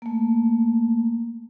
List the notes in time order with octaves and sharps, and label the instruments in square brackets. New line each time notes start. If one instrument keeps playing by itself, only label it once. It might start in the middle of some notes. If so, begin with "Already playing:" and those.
[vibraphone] A3 A#3